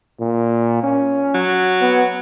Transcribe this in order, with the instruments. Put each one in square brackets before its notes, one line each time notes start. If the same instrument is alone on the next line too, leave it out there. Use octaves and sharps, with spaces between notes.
[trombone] A#2
C#4
[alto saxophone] F#3
[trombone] B3